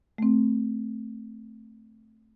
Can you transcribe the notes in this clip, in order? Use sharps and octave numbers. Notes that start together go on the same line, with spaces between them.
A3 C4